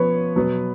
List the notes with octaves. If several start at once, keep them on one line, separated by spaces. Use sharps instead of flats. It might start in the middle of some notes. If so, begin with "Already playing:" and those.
Already playing: F3 B3 B4 C#5
B2 F#3 B3